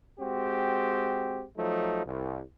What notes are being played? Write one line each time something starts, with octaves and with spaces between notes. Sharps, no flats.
G#3 C4 F#4 G4
F3 F#3 A3 D#4
C2